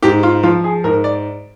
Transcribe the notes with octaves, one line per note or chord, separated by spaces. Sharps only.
G#2 G4
F4
F3 F4
G#4
G#2 A#4
D5